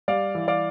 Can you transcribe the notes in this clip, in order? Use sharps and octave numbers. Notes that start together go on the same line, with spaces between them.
G3 D5 F5
E3
D5 F5